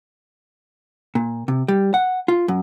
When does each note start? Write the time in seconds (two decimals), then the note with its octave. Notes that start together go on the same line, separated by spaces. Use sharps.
1.15 A#2
1.48 C3
1.68 G3
1.94 F#5
2.28 F4
2.48 F#2